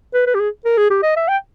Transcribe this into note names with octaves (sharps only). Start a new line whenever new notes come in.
B4
B4
G4
G#4
A#4
G#4
G4
D#5
E5
G5